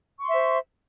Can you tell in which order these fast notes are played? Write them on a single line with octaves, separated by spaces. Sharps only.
C#6 C6 E5 C5